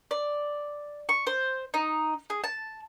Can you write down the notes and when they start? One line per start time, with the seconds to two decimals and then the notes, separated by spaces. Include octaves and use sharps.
0.11 D5
1.09 C#6
1.27 C5
1.74 D#4
2.30 G#4
2.44 A5